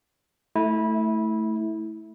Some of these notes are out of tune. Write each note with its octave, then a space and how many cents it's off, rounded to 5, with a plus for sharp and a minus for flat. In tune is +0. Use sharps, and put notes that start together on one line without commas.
A3 +0 E4 -20